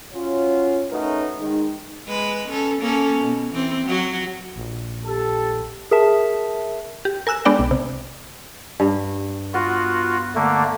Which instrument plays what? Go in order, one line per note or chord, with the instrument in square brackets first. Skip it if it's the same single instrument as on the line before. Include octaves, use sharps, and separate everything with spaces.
[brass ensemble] C#4 F4 F#4 C#5
A3 C#4 D#4 F#4 A#4 B4
D#3 G#3 D#4
[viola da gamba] G#3 B4
C#4 A4
A#3 C#4 A4
B2
E3 C4
F#3 F#4
[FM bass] A#1
[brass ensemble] G4 A4
[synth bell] G#4 A#4 E5 A5
[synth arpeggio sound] G4
A#4 G#5 E6 F#6 E7
G#3 B3 D4 D5 G5
B1
C3
[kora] G2
[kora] B3 [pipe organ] F4 F#4
[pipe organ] D3 A3 A#3